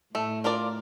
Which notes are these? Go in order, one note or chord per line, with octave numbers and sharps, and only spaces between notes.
A2 A3
D4 F4 A#4 D5